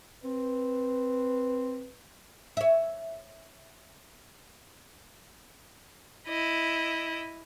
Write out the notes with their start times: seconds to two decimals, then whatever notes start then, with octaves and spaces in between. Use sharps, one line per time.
0.24 C4 B4
2.57 C#5 E5
6.28 E4 D#5